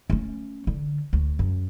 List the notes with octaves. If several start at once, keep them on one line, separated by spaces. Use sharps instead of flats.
A3 C#4
D3
D2
F#2